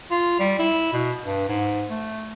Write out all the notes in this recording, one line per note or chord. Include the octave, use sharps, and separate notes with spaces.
F4
G3
E4
B2
G2
G#2
A3